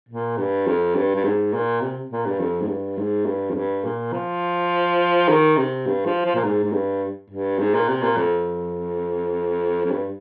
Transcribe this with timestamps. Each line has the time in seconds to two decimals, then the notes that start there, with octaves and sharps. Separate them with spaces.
0.09 A#2
0.38 G2
0.67 F2
0.96 G2
1.15 G2
1.24 G#2
1.54 A#2
1.81 C3
2.11 A#2
2.26 G2
2.40 F2
2.61 G#2
2.68 G2
2.98 G#2
3.26 G2
3.50 F2
3.55 G2
3.85 A#2
4.13 F3
5.29 D#3
5.57 C3
5.86 G2
6.06 F3
6.25 F3
6.35 A#2
6.44 G#2
6.64 G#2
6.73 G2
7.30 G2
7.59 G#2
7.74 A#2
7.89 C3
8.03 A#2
8.17 F2
9.85 F2
9.91 G2